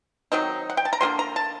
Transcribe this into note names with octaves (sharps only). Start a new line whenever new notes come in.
D#3 F#3 C4 D#4
F#5
G5
A5
A#5
D3 F#3 A#3 D4 C6
A#5
A5